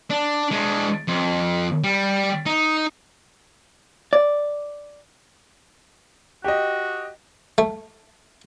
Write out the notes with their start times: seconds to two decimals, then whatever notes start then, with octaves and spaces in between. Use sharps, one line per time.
0.10 D4
0.51 G#3 D4
1.08 F2
1.84 G3
2.46 D#4
4.13 D5
6.44 F#4 G4 D#5
7.58 A3